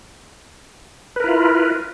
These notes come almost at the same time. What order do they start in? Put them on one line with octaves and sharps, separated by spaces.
B4 A#4 E4 F4